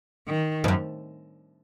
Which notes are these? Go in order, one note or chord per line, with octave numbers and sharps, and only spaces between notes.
D#3
F2
F#2